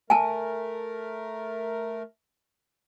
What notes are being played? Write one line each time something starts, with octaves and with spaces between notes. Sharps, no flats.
A3 A#4 G#5 A5